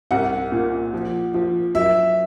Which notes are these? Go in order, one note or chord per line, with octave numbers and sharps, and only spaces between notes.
C2 F#5
A#2
F3
F3
F#3 E5